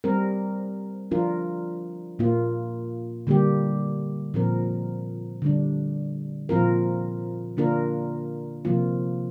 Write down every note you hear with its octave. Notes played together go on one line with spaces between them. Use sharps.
G3 C4 A#4
F3 D4 F4 A#4
A#2 A#3 F4
D3 G3 A#3 G4
A#2 F3 C4 A#4
D3 G3 D4
A#2 F3 C4 F4 A#4
D3 A#3 D4 F4 A#4
C3 F3 A#3 F4